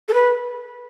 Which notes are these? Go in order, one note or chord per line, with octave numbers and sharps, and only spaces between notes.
A4
B4